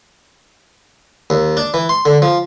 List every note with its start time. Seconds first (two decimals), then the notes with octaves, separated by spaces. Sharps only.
1.30 D#2
1.57 D4
1.74 E3
1.89 C6
2.05 D3
2.22 F3